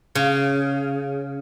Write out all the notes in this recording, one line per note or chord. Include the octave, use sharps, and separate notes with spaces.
C#3